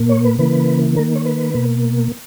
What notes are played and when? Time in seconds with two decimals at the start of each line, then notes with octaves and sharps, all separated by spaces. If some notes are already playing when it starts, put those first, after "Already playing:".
Already playing: A#2 A#3
0.09 C#5
0.24 B4
0.38 C#3 E3 A#3 B4
0.96 D#3 A#3 A#4
1.16 C#5
1.25 B4
1.54 B2 A#3